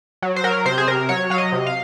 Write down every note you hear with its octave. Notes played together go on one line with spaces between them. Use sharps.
F#3
C5
F#3 A#4
C3 C5
G#4
C3 A#4
F#3 C#5
F#3 F5
D#5
C3
F5